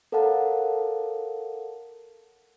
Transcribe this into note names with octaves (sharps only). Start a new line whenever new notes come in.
A4 A#4 C#5 F5 F#5 A5